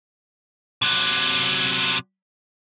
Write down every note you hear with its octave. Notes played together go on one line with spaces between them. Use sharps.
C3 F#3